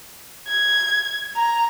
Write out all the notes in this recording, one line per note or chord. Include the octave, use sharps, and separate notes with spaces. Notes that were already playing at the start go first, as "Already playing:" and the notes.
G#6
A#5